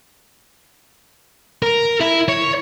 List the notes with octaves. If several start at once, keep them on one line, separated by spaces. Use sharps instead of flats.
A#4
E4
C#5